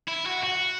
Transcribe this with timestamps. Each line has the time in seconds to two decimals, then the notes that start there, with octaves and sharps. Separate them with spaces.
0.08 E4
0.26 F#4
0.44 F#4